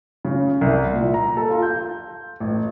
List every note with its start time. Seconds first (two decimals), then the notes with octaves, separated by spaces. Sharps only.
0.25 C#3
0.61 C2
0.93 A#2
1.14 A#5
1.37 A4
1.50 F4
1.62 G6
2.40 A1